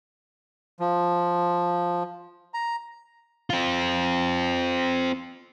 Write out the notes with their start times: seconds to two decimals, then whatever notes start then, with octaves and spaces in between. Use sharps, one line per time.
0.80 F3
2.54 A#5
3.50 C4 F4